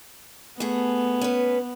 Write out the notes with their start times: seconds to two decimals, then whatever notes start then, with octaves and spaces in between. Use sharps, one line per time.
0.60 A3 B3 G#4
1.21 C#4 B4